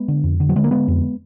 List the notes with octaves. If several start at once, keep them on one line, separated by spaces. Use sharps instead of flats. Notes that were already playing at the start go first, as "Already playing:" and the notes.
Already playing: G#3 B3
D3
F2
D3
F#3
D3 G#3
A#3
D3 G#3 B3
F2